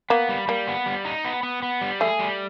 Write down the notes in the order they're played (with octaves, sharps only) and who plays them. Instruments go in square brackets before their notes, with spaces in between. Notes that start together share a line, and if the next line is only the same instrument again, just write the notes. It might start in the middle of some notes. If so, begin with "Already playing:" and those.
[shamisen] A#3 [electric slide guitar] B3
[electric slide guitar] G3
[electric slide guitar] G3 [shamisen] A#3
[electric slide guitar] B3
G3
D#4
B3
B3
B3
G3
[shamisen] A3 [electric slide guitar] G#4
[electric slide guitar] G3